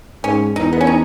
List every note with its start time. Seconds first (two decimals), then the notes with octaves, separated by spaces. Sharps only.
0.24 G#2 C#4
0.56 E2 D#4
0.73 B3
0.81 C#4
0.87 D#4